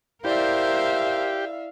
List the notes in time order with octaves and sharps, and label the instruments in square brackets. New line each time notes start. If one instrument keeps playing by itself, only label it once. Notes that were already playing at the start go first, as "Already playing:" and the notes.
[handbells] E4 D5 [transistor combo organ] G4 [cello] A#4 C5 [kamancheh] E5 F5